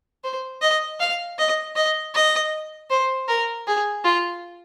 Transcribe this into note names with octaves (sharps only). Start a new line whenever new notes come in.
C5
D#5
F5
D#5
D#5
D#5
C5
A#4
G#4
F4